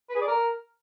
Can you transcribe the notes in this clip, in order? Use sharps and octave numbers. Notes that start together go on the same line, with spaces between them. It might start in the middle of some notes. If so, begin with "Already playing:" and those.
B4
G#4
D5
A#4